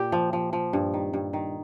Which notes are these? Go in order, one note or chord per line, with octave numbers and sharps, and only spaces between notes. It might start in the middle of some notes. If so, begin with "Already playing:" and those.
Already playing: A#2 G4
F3
F3
F3
G2
D#3
G2
D#3